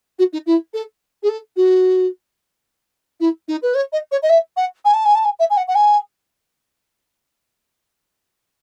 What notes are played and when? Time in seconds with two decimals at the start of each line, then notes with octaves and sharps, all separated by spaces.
0.19 F#4
0.33 D#4
0.46 E4
0.74 A4
1.23 G#4
1.29 A4
1.56 F#4
3.20 E4
3.48 D#4
3.62 B4
3.75 C#5
3.93 D#5
4.12 C#5
4.23 D#5
4.30 E5
4.57 F#5
4.85 G#5
4.94 A5
5.05 G#5
5.15 A5
5.25 G#5
5.39 E5
5.50 G#5
5.57 F#5
5.68 F#5
5.75 G#5